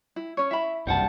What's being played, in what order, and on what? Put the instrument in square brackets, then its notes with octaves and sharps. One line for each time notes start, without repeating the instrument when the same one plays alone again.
[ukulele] E4
C#4 C#5
[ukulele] E4 B5 [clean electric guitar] E5
[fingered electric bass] F#1 C2 G2 [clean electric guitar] G3 F#5 A5